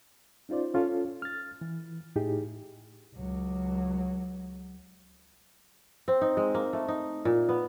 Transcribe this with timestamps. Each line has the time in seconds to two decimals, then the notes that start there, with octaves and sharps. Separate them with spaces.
0.49 C#4 D#4 F4 C5 D5
0.74 C#4 F4 A4
1.22 F6 A6
1.61 E3
2.16 A2 D#4 E4 G4 G#4
3.16 C#2 F#3
6.08 C4
6.22 D#4
6.37 G#3
6.55 A#3
6.73 A3
6.88 D#4
7.25 A#2
7.49 B3